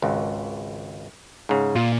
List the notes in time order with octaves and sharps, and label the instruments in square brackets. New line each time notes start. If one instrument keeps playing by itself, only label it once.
[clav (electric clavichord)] G#1 C#2
G#2 C#3
[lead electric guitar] A#2 [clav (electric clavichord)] F4